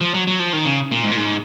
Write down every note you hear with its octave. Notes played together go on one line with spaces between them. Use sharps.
F3
F#3
F#3
F3
D#3
C#3
A#2
G#2
A#2
G#2